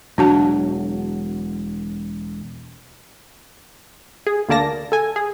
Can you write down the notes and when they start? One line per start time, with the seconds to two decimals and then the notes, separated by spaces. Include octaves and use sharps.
0.18 E1 F#3 D4 F#4 A5
4.27 G#4
4.49 D2 D3 A#3 D5 A5 A#6
4.92 A4 G#5
5.16 G#4